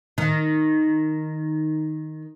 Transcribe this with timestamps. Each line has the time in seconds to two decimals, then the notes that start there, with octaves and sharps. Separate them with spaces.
0.18 D#3